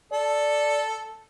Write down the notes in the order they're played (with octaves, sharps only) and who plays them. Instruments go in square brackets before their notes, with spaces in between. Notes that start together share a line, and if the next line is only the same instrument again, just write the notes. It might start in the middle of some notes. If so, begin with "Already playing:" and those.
[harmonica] A4 [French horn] D5